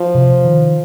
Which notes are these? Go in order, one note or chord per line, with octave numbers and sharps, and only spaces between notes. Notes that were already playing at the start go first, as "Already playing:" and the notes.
Already playing: F3
C3
D#3